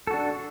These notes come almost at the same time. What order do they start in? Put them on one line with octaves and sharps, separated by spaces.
A4 F#4 D4